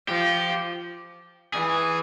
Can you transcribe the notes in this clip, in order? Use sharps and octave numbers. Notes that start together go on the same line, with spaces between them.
F3 G4
E3 G#4